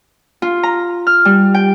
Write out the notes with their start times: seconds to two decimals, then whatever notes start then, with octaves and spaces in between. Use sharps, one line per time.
0.42 F4
0.63 A#5
1.07 F6
1.25 G3
1.54 G5